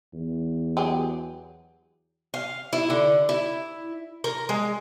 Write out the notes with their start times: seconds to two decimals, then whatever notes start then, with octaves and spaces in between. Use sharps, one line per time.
0.13 E2
0.77 F#3 G4 G#4
2.34 F5
2.73 E4
2.90 D3
3.29 E4
4.24 A#4
4.49 G#3